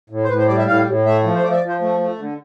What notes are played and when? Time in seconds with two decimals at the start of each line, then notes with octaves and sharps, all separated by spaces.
0.10 A2
0.24 C5
0.29 A2 B4
0.39 C5
0.48 G3 D5
0.58 E5
0.67 A2 F5
0.86 A2
1.05 A3 E5
1.24 F3
1.35 C5
1.43 F3 D5
1.51 E5
1.55 D5
1.62 F3
1.69 C5
1.81 A3
2.00 A3
2.19 D3